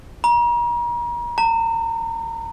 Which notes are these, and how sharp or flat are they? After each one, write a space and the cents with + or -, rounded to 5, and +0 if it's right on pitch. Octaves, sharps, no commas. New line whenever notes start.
A#5 +40
A#5 -35